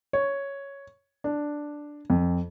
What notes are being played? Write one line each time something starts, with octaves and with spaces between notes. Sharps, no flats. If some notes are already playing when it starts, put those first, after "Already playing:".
C#5
D4
F2